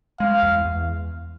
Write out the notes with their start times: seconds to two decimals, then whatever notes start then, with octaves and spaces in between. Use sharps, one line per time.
0.20 G#3 F5
0.43 E2
0.65 E2